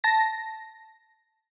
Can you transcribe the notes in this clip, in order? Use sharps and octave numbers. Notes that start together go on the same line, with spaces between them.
A5 A#6